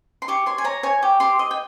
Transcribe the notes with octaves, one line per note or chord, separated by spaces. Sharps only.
C6
G4 C#6
C#5 C6
G#5
C#5 A#5
C#5 G#5
G4
G4 C6
D#5
G5